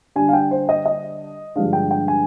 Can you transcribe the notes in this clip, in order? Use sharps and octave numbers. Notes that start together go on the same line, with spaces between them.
D3 G3 D4 G#5
F5
G5
C5
D#5
D#5
G2 D3 F3 G#3 D4 F5
G5
G5
G#5